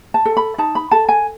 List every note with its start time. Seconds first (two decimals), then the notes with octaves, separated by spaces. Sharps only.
0.14 A5
0.25 A4
0.37 B5
0.58 D#4 A5
0.75 B5
0.91 A4 A5
1.09 G#5